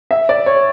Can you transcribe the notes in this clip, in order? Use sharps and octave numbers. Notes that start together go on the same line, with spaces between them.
E5
D5
C#5